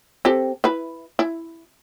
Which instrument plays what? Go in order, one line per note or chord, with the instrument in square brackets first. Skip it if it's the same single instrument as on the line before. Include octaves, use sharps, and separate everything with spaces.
[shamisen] C4 G4 A4
E4 B4
E4